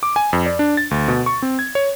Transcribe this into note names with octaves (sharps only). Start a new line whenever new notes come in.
D6
G#5
F2
D5
D4
A6
D2
B2
C#6
C4
G#6
C#5